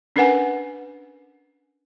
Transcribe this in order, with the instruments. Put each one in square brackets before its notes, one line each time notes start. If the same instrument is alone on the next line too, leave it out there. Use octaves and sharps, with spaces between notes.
[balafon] C#4 D4 A#4 B4 F#5 G#5